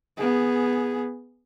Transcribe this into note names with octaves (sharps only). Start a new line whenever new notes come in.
B3 G#4